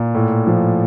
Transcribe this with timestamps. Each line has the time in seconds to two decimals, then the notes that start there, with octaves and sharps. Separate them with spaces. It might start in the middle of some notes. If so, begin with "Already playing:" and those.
Already playing: A#2
0.15 A2
0.47 F3